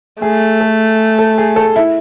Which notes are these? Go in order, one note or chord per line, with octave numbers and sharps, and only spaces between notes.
A3 G#4
A4
A4
G#4
A4
E4